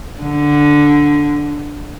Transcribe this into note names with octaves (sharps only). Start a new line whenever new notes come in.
D3